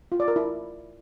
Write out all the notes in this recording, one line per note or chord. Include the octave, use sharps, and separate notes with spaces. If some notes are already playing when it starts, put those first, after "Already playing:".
F4
D5
A#4
E4